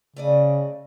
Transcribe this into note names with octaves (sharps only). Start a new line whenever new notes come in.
C#3 A3 D5 D#5